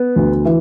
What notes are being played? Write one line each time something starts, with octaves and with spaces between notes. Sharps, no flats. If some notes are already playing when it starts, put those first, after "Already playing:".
Already playing: B3
D2
E3